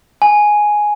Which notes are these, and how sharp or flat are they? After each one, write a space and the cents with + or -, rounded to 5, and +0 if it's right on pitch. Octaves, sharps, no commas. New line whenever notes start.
G#5 +5